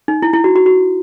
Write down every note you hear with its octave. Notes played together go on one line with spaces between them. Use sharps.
D#4
E4
E4
F#4
F#4
F#4